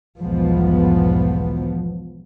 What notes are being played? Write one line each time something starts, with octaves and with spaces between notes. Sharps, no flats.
B1 E2 G#2 F3 B3